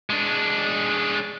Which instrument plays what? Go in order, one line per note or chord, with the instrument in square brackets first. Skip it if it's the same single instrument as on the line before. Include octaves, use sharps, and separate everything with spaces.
[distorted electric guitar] G#3 D4